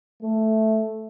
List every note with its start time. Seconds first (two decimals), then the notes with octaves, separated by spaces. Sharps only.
0.22 A3